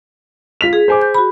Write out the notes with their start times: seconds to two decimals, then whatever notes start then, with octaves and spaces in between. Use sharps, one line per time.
0.61 F4 B6 F7
0.73 G#4
0.88 C5 G#5 D6
1.02 G6
1.14 F#4 B5